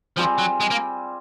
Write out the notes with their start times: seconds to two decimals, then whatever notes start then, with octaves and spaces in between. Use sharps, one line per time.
0.17 F3 G3 C4 F4 G#4
0.39 F#3
0.61 G#3
0.71 A#3